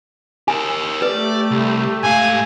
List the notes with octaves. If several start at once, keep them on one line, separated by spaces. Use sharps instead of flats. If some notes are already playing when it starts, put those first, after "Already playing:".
G4 A#4 G#5
A3 G4 B4 D5
C2
G#2 F5 G#5